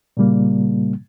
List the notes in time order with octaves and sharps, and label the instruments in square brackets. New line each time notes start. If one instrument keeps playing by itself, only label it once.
[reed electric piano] A#2 C#3 G3 A#3